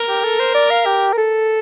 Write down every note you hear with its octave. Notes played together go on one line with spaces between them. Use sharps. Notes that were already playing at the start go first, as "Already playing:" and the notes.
Already playing: A#4
G4
A4
C5
D5
F5
G4
A#4
A4